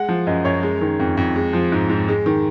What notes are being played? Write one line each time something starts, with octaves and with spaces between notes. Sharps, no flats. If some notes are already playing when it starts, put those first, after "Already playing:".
Already playing: G#3 F#5
F3
F#2 D#5
F#2 C#5
G#3
D#3
F2
F2
G#3
F3
G#2
G#2
G#3
D#3